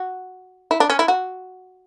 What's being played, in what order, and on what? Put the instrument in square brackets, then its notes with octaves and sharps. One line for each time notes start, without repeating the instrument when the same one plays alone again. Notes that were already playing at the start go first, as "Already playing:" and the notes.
Already playing: [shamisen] F#4
E4
D4
C#4
E4
F#4